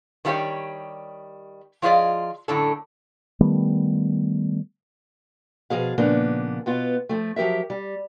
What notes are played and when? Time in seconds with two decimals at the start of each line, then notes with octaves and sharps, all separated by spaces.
0.25 D#3 G3 A#3 E4 G4 C#5
1.82 F3 F#3 F4 G#4 D5 D#5
2.48 F#2 A2 D3 A4
3.41 D#3 G3 A3 B3
5.70 B2 E3 F3 G#4 F5
5.98 A#2 C#3 F3 A#3 B3 D4
6.66 B2 B3 F4
7.09 F3 A3
7.36 F3 F#3 G4 A#4 E5
7.70 G3